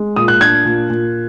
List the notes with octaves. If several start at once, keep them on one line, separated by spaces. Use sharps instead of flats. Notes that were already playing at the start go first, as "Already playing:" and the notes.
Already playing: G#3
A#2 D#6
F#6
D4 G#6
A#2
A#2